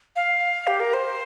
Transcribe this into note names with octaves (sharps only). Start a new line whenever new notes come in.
F5
G4
A#4
C5